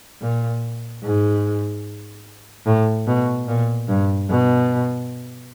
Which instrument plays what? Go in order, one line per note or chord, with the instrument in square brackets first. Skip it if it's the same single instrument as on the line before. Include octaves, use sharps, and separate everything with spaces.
[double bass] A#2
G#2
A2
B2
A#2
G2
B2